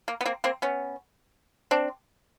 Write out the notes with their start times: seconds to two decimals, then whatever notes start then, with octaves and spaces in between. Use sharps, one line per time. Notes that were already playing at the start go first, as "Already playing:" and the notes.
0.08 A#3
0.21 B3
0.26 A#3 C4
0.44 A#3 C4
0.62 B3 C#4
1.71 C4 D4